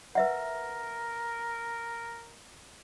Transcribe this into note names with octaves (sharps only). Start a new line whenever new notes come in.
A#4 B4 E5 F#5